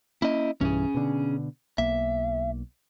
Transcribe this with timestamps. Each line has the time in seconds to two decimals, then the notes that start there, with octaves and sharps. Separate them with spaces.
0.22 A#3 C#4 E4 D#5
0.61 B1 G2 E3 C#4 G#4
0.94 B2 D3
1.78 B1 A#3 E5